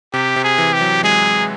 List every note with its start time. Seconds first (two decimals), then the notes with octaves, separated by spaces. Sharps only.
0.13 C3 G4
0.36 C3
0.44 G#4
0.58 E3
0.73 G4
0.81 F#3
1.03 G#3 G#4